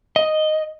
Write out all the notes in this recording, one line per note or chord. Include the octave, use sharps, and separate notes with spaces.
D#5